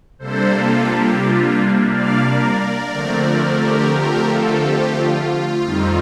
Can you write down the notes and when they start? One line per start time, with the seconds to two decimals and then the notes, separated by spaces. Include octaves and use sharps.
0.19 C3 G3 A#3 D4 A4 C5
0.53 F4 A4
0.87 G4
1.22 F4
1.89 D5 F5
2.24 A#4 D5
2.92 D3 F3 A3 C4
3.59 G4 A#4
3.93 G4 A#4
4.27 F4 A4
4.61 G4
4.95 F4
5.63 F2 D#3 G3 C4 D#4